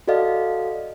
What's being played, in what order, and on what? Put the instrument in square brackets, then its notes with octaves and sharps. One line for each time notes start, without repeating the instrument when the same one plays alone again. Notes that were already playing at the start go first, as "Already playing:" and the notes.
[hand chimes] F#4 A4 D5 D#5 F5